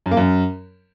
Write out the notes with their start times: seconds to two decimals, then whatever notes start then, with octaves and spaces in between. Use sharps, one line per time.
0.06 F#2
0.11 A#3
0.17 F#2